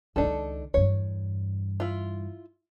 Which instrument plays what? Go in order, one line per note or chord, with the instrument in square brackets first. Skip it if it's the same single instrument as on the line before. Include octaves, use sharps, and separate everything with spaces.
[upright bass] C#2 D#3 [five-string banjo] D4 D#4 A4
[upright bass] E2 G2 [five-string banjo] C#5
[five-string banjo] E4 F4